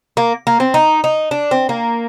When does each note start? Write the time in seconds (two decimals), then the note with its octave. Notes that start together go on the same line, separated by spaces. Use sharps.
0.17 A#3
0.47 A#3
0.60 C4
0.74 D#4
1.04 D#4
1.31 D4
1.51 C4
1.69 A#3